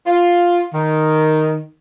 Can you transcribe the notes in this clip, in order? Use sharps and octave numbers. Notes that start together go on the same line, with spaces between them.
F4
D#3